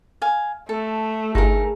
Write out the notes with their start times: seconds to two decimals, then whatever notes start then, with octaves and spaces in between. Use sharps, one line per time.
0.22 F5 G#5
0.69 A3 A4
1.35 G1 D#4 G#4 A#4